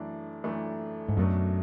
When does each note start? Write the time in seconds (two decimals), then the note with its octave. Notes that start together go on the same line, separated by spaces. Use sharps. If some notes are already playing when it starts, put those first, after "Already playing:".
Already playing: F#2 E3 A3 D4
0.44 F#2 E3 A3 D4
1.09 G#2
1.17 F#2 B2 F#3 A3 D4